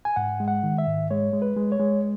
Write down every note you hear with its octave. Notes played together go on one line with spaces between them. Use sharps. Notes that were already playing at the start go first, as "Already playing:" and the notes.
G#5
G#2 F#5
G#3
F#5
D#3
E5
G#2
G#3 C#5
G#3
B4
G#3
C#5
G#3